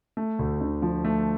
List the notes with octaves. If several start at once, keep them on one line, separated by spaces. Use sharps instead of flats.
A3
D2
D3
F3
A3